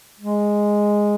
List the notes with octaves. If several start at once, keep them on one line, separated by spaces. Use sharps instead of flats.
G#3